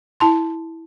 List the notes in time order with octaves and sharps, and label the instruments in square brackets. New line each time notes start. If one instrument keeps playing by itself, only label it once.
[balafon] E4 A5 C6